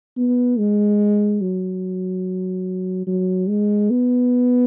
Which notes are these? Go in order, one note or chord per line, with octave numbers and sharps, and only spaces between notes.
B3
G#3
F#3
F#3
G#3
B3